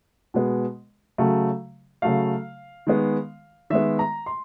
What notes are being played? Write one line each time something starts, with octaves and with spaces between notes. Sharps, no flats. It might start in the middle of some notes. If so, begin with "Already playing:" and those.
B2 G#3 B3
C#3 F#3 A3
C#3 F#3 A3 F5
D#3 G#3 B3
D#3 G#3 B3 E5
A#5
C6